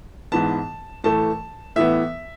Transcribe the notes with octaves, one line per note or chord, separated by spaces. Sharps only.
G#2 E3 B3 A5
A2 E3 A3 A5
A2 E3 B3 E5